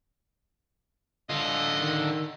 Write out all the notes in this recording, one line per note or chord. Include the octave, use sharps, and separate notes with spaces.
D3 F4 D#5
D#3